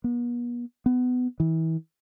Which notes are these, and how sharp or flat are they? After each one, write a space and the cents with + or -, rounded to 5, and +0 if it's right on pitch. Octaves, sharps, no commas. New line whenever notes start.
B3 -40
B3 +20
E3 -35